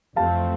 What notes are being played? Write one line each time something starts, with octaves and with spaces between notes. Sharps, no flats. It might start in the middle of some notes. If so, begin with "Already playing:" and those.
F2 C3 E3 A3 C4 F5 A5